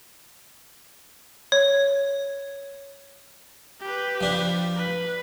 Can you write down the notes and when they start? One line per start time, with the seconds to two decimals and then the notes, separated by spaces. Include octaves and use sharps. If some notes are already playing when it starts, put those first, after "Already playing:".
1.52 C#5
3.81 G4 B4
4.21 F3 D4 F4
4.76 B4